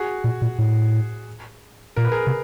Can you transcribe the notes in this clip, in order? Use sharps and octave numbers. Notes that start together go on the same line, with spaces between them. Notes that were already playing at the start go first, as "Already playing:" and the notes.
Already playing: F#4 G#4
A#2
A#2
A2
A#2 A#4
B4
G#4 A#4
C3